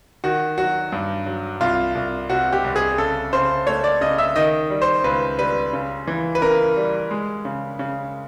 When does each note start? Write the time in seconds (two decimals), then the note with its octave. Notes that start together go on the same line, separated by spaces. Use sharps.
0.24 D#3 F#4
0.58 F#3 F#4
0.92 G2
1.26 F#3
1.61 C2 F4
1.95 C2
2.29 C3 F#4
2.53 G4
2.64 C2
2.76 G#4
2.98 C#3 A4
3.33 C#3 C5
3.67 A3 C#5
3.84 D5
4.01 C#3 D#5
4.18 E5
4.36 D#3 D#5
4.70 G3
4.82 C5
5.04 C#2 B4
5.39 G3 B4
5.73 C#3
6.07 E3
6.35 B4
6.42 C#3 A#4
6.77 G3
7.11 G#3
7.45 C#3
7.79 C#3